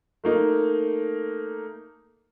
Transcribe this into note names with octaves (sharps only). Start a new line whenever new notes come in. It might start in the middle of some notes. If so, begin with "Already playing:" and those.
A3 A#3 D#4